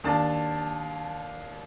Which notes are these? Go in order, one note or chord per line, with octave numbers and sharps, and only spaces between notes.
D#2 D4 A5 A6